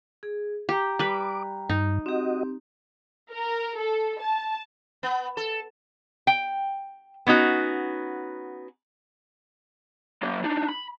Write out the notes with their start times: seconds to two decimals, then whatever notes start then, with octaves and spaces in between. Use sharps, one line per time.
0.23 G#4
0.69 G4 G5 A#5
0.99 G3 B4 D6
1.69 G2 D#4
2.06 C4 F#4 G4 D#5
3.31 A#4
3.76 A4
4.20 A5
5.03 B3
5.37 A4
6.27 G5
7.27 B3 C#4 D#4 F#4
10.23 F#3 A#3
10.44 D4 D#4
10.69 B5